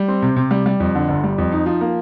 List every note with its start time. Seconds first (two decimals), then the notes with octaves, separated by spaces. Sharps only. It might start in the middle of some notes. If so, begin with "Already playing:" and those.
Already playing: G3
0.08 C4
0.22 C3
0.36 C3
0.51 G3
0.66 G3
0.80 F2
0.95 D3
1.08 G1
1.24 G3
1.38 F2
1.52 D#4
1.66 F3
1.81 A#3